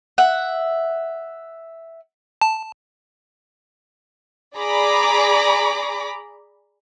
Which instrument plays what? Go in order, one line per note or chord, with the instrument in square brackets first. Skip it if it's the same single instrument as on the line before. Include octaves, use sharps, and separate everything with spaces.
[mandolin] E5 F#5
[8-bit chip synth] A5
[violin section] G#4 D5 A#5 B5 D6